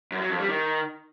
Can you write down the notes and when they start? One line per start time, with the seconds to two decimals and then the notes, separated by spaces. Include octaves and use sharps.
0.12 F#2
0.21 F#3
0.30 F2
0.39 G3
0.49 D#3